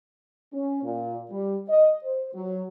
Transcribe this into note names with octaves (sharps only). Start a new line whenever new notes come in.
C#4
A#2
G3
D#5
C5
F#3